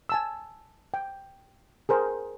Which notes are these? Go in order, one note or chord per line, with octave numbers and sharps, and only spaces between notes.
G#5 A5 E6
G5
G#4 A#4 C5 G5